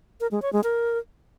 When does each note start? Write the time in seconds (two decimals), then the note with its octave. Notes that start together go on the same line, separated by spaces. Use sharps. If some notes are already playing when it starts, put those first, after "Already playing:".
0.21 A#4
0.31 G#3
0.42 C#5
0.53 G#3
0.64 A#4